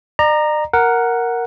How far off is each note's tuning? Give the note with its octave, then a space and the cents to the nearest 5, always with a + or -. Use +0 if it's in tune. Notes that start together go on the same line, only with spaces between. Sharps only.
D5 +45 A#5 +0
A#4 +0 F#5 +0